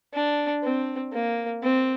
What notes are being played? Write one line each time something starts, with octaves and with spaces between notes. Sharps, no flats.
D4
C4
A#3
C4